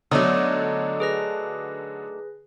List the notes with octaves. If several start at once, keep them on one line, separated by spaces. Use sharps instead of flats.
D3 F#3 A3 B3 D4 D#4 C#5 D5
G#4 B4 A#6